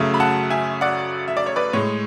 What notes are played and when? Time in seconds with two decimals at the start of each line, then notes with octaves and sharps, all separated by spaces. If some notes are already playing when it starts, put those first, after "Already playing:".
Already playing: F#2 C#3 F#3 A3
0.14 B5
0.20 F#5 A5
0.50 E5 G#5
0.81 D5 F#5
1.28 E5
1.37 D5
1.46 C#5
1.56 B4 D5
1.73 A2 G#3 C#5